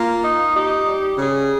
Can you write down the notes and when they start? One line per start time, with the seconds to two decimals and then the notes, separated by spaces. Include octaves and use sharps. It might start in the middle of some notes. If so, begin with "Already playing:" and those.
Already playing: A#3 F4
0.22 D#4
0.55 D#4 G4
0.87 G3
1.18 C#3 G#4